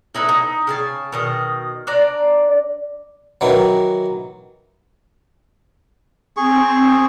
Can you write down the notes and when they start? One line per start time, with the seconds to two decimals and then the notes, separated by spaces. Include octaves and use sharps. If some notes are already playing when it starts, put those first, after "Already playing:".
0.15 D#4 E4 A4 B4
0.29 D#4
0.67 C#3 G#5 A5
1.12 B2 D#3 D#5
1.87 D4 D5 A#5
3.41 D#3 E3 F#3
6.37 C4 G#4 C#6